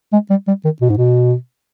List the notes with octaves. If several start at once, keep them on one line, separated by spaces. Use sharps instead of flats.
G#3
G3
G3
D#3
B2
G#2
B2